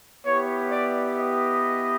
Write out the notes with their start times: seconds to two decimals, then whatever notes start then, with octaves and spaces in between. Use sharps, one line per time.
0.24 B3 E4 G4 C#5
0.70 D5
1.16 D#5